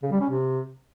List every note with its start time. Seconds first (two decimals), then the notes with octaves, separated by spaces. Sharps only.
0.03 C#3
0.12 G3
0.21 C#4
0.30 C3